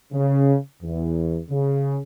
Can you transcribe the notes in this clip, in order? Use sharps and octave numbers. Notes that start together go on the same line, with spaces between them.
C#3
E2
C#3